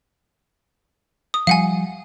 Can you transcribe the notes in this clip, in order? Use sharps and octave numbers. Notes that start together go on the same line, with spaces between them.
D#6
F3 G3 F5 F#5 G#5